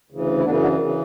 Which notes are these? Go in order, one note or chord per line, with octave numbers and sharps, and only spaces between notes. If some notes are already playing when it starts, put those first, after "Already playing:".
D2 C#3 E3
E4
F#2 C#3 E3 B3 D4
D4 F#4
C#3 E3